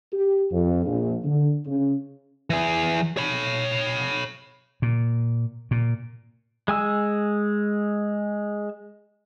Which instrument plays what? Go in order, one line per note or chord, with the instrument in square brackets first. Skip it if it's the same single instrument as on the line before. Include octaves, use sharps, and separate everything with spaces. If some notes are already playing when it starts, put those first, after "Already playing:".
[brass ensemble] G4
F2
A#1
D3
C#3
[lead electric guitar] E3 G#4
C#5 B5
[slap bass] A#2
A#2
[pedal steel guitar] G#3 G#5 E6